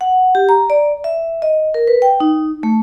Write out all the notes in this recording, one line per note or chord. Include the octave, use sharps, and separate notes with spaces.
F#5
G4
A#5
D5
E5
D#5
A#4
B4
G5
D#4
A3